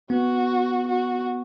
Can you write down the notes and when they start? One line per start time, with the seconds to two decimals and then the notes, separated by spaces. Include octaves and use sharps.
0.10 B3 F#4
0.88 F#4